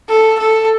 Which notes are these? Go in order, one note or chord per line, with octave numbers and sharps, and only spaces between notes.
A4
A4